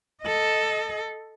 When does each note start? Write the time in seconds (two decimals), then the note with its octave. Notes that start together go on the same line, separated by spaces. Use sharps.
0.22 A4 D#5